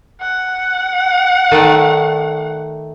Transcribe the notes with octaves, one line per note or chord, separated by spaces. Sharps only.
F#5
D#3 A3 D5